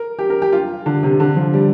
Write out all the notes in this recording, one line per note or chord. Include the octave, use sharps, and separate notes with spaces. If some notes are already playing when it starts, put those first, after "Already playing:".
Already playing: A#4
G4
A#4
G4
F4
D3
C3
D3
F3
G3